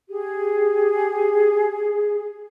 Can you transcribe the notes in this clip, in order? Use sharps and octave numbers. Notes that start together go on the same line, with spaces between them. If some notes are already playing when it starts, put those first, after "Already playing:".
G4 G#4